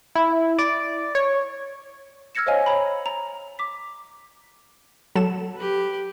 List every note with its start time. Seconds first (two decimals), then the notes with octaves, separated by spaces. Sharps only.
0.15 E4
0.59 D5
1.15 C#5
2.35 E6 F6 G#6 A#6 C#7 E7
2.46 C5 C#5 D#5 F5 G#5
2.66 C#5 A#5 B5
3.06 A#5
3.59 D6 B6
5.15 F#3 A4 E7
5.56 G4 B4